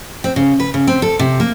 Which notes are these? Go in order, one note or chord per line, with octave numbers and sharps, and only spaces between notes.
C4
C#3
B4
C#3
C4
A4
C3
A#3